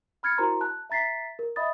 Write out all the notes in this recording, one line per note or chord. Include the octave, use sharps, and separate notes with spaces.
B5 F6 G#6 A6 C#7
E4 F#4 A#4 C5 A#5 C6
A5 F#6
E5 A#5 A6 B6 C7
A#4
D#5 E5 B5 D#6 A6